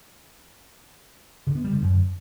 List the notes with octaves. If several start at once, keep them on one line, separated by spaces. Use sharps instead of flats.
D3
B3
G3
D3
F#2